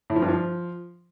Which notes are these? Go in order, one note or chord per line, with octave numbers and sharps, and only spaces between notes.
A2
F3
G2
F3